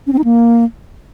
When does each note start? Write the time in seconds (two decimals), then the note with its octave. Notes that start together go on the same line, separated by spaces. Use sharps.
0.07 C#4
0.13 C4
0.18 D#4
0.24 A#3